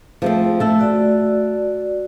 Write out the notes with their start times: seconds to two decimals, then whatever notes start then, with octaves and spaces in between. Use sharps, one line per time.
0.22 F3 A3 C4 G#4
0.60 A3 A4
0.79 F#4 D5